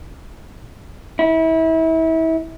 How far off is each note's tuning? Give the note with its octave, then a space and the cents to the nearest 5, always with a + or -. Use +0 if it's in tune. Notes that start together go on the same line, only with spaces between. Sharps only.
E4 -30